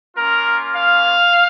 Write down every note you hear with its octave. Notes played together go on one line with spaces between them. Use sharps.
A#3 C#4 F4 A#4
F5